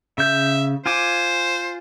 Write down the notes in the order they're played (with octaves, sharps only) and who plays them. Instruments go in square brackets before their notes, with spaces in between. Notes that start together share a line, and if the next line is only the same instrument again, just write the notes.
[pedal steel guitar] C#3 G6 [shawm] E5
[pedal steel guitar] F4 G#5 D6 [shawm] C5